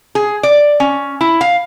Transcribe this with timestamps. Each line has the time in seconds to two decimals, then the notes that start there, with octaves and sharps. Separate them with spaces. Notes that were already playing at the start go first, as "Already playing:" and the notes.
0.15 G#4
0.43 D5
0.80 C#4
1.21 E4
1.41 F5